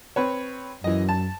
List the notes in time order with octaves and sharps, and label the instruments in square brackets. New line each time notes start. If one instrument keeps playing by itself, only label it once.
[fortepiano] C4 B4 C#5
[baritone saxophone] F#2 [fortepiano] E3 D#5
[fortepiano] A5